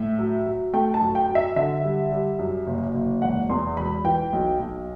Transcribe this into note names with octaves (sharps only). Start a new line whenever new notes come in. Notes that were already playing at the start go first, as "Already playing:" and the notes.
Already playing: A2 E5
F#3
F#3
A3 G5
A5
F#2
G5
F#3
E5
D3 E5
G3
G3
F#2
F#1
F#1
E1 F#5
E2 C6
E1 B5
E3 G5
B1
B1